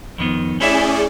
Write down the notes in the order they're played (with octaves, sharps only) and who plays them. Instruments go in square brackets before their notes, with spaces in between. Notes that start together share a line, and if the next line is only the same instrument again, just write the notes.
[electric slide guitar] F2 D#3 B3
[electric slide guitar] A3 E4 E5 [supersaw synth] C#4 G#4 D5